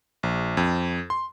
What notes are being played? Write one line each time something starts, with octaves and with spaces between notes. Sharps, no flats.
A#1
F2
C6